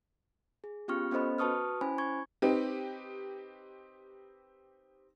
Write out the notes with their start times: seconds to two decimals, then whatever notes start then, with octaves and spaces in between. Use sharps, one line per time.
0.64 G#4
0.88 B3 C#4 F4 G4 C#6 F6
1.11 B3 C#4 A4 C5 D#5 B5
1.38 F#4 B4 A5 C#6 D#6 F6
1.81 C#4 E4 C5 G#5 B5
1.98 C#6 G#6
2.42 C4 D#4 G4 B4